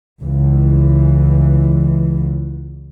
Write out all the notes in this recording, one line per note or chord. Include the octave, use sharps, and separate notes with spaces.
C#2 E3